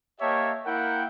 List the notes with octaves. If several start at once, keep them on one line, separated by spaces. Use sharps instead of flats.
A#3 G4 C#5 D#5 E5 A5
A#3 E4 A#4 F#5 G5